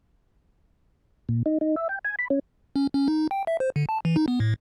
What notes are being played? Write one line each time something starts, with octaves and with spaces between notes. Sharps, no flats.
A#2
D#4
D#4
E5
G5
G#5
B5
C#4
C#4
C#4
D#4
G5
E5
C5
D3
A5
E3
D#4
B3
A2